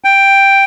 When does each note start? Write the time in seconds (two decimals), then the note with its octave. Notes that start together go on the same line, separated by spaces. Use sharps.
0.04 G5